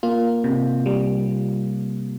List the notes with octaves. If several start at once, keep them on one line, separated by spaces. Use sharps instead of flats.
A#3 F4
C3
G3